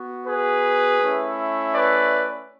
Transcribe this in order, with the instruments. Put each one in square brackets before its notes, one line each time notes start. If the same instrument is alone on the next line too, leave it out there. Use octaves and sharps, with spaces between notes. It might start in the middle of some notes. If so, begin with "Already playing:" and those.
Already playing: [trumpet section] B3 F#4
G#4 B4
A3 C#4 E4
B4 D5